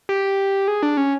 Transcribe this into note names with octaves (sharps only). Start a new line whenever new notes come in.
G4
G#4
D4
C#4